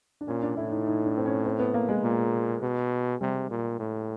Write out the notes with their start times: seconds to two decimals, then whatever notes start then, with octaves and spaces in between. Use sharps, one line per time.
0.21 D4
0.28 A#2 C#4
0.42 D4
0.57 A2 E4
0.71 D#4
0.86 D#4
1.06 D4
1.17 C4
1.26 C#4
1.45 C4
1.59 B3
1.74 A#3
1.89 G#3
2.04 A#2
2.63 B2
3.21 C3 G3
3.50 A#2
3.79 A2